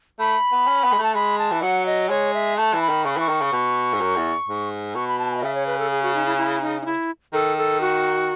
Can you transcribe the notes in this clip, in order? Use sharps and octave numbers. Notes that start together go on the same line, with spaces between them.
A3 B5
B3
C#4
B3
G#3
A3 A5
G#3 B5
A5
E3
F#3 F#5
D#5
G#3 C#5
E5
A3 A5
E3
B5
D#3
C#3 C#6
B5
E3 C#6
D#3
C#3
B2
G#2
F#2
E2
G#2
B2 C#6
B5
A5
G#5
D#5
C#3 E5
C#5
B4
A4
G#4
F#4
D#4
E4
E4
D#4
D#4
E4
D#3 A4
A4
F#4